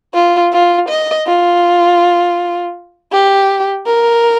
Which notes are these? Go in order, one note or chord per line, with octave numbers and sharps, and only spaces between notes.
F4
F4
D#5
F4
G4
A#4